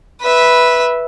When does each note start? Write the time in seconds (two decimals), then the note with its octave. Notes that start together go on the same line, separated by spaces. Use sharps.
0.22 B4 E5